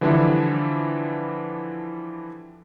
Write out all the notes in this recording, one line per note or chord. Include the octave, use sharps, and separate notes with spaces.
D3 E3 F3 G3 D4 E4